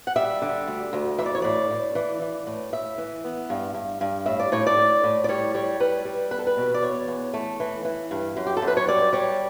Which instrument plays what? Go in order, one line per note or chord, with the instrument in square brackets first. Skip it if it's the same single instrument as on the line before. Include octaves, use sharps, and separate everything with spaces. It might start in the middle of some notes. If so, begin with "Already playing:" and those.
[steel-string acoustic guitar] F#5
G3 E5
D3
D2
D2
E3 E5
D5
C#5
A2 D5
A2
E3
E3
A2
A2 E5
E3
B3
G2
G2
G2
A2 E5
D5
A2 C#5
D5
A2
A2
D5
G3 C#5
G3 C#5
G3 B4
G3
E2 B4
A4
B4
B2
D5
E2 C#5
E2
A3
E3
E3
G2
F#2
G4
A4
F#2
B4
C#5
G3 D5
G3 C#5